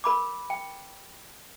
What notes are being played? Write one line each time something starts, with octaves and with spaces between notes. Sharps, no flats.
A#4 B5 D6
G5